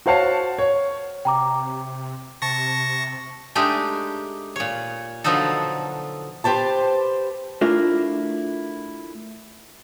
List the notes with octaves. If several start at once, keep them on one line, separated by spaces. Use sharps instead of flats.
F#4 C5 C#5 F5 F#5 A5
C#5
C3 G5 A#5 D6
C3 A5 C#6 A#6
G#3 A3 D4 D#4 G4
A#2 C#5
B2 D3 F3 F#3 D#4 A4
G4 B4 C5 A5
A3 D4 E4 F4 A#4